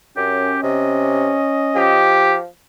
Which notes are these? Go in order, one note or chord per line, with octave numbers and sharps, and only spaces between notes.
F#2 C#4 G4
C3 D#5
F3 G4